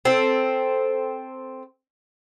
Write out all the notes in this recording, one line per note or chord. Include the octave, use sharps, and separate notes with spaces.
C4 A4